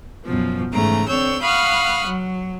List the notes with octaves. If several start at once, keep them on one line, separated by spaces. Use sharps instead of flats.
F#2 B2 F3
G#2 C#3 E3 A3 A#5
D3 C4 C#5 E6 G6
F5 F#5 B5 C#6 D#6 F6
F#3